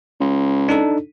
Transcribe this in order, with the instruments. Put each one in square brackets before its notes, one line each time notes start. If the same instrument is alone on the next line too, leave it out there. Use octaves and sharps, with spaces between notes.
[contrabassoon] C#2
[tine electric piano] D4 D#4 A4